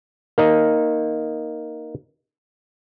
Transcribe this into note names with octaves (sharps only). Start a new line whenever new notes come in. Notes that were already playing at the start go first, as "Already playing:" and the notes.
A#3 D#4 D#5